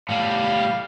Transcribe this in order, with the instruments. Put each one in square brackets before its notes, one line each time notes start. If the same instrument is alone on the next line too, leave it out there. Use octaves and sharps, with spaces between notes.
[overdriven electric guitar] A2 G3 [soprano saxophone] F5